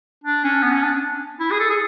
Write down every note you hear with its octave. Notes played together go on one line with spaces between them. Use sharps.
D4
C#4
B3
C#4
D4
E4
G#4
A4
G#4